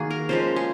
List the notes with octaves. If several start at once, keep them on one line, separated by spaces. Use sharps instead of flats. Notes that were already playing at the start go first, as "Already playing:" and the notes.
Already playing: D#3 A#3 F#4 G#4
A#4
C#3 F3 G#3 C5
G#4